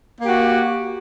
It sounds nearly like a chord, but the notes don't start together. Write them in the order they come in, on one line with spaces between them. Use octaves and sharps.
A#3 G4 F#4